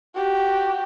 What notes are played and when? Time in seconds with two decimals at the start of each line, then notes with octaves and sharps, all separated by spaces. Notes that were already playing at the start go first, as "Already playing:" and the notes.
0.16 F#4 G4